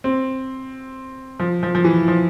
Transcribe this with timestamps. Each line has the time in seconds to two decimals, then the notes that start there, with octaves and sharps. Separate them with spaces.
0.04 C4
1.40 F3
1.63 F3
1.75 F3
1.84 E3
2.08 F3